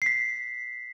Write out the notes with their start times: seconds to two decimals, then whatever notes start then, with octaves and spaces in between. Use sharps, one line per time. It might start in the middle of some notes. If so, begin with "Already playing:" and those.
0.02 C7
0.06 B6